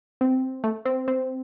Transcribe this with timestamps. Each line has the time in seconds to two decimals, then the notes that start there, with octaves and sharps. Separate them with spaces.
0.21 C4
0.64 A3
0.85 C4
1.08 C4